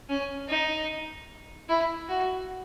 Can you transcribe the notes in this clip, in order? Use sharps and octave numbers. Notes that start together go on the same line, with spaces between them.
C#4
D#4
E4
F#4